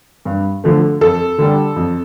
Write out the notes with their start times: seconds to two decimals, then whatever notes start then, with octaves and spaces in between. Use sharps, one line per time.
0.25 G2
0.64 D3 F3 A3
1.01 F2 A4
1.38 D3 G3
1.76 F2